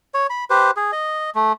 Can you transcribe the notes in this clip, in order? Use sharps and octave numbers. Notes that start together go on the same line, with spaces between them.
C#5
B5
G4 B4 C5
G#4
D#5
A3